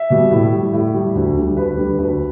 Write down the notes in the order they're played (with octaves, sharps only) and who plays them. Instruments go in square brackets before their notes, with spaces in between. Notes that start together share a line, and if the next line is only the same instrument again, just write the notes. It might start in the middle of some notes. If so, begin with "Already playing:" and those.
Already playing: [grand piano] E5
B2 G3
A2
G3
A2
G3
D2
D3 G3
D2 B4
D3 G3
D2 B4